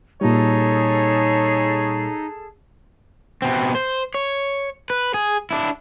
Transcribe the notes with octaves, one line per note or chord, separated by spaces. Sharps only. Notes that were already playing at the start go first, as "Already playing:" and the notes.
A#2 G3 D#4 G#4 A4 C#5 A5
B2 C4
C5
C#5
B4
G#4
D4 E4